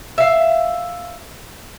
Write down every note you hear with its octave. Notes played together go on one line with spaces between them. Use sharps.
E5 F5